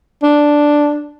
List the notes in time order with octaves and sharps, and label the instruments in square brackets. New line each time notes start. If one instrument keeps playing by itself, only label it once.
[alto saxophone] D4